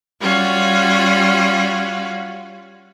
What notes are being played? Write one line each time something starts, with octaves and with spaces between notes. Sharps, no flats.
G3 C#4 F4 F#4